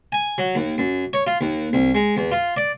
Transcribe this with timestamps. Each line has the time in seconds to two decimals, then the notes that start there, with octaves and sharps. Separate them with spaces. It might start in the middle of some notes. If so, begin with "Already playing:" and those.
0.12 G#5
0.38 F#3
0.55 D#2
0.78 F#2
1.13 C#5
1.27 F4
1.41 D#2
1.73 C2
1.95 G#3
2.17 E2
2.32 F4
2.57 D5